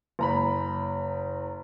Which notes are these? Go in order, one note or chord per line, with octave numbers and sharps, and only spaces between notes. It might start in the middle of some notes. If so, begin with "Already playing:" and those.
F#1 A#5 B5